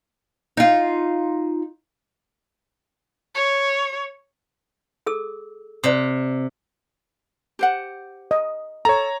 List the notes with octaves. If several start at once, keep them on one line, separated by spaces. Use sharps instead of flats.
D#4 F4
C#5
G#4 A4 E6
C3 C5 D5 D#6
G4 C5 F#5
D#5
A4 C#5 A#5